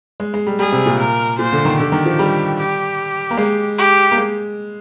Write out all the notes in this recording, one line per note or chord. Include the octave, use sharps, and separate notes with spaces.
G#3
G#3
G3
G3 G#4
C3
A#2
A#4
A#2 C5
D3
D#3
D3 G4
D#3
F3
G3
G4
A#3
G#3
G4
A#3
G#3